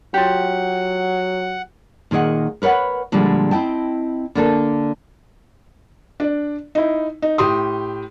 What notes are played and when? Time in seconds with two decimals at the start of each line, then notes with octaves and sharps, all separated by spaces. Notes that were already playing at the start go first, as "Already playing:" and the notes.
0.14 F#3 F4 G4 F#5
2.11 A#2 D#3 G#4 D#5 F#5
2.62 A#4 B4 C#5 F5 F#5
3.12 A#2 D3 F3 G3 G#3
3.51 C4 E4 D#5 G5 A5
4.35 D3 A#3 D4 A4
6.20 D4 D5
6.75 D#4 E4
7.22 D#4
7.38 A2 G4 C6 D#6